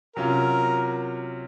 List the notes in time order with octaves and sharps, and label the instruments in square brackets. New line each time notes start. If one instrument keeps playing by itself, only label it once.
[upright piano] C3 F#3 C#4 F4 [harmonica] A#4